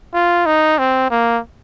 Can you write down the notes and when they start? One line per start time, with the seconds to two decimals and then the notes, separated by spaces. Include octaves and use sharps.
0.14 F4
0.46 D#4
0.78 C4
1.11 A#3